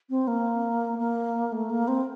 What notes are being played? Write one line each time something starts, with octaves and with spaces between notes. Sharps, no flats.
C4
A#3
A#3
A3
A#3
C4